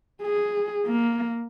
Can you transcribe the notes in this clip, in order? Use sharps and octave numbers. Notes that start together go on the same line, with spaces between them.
G#4
A#3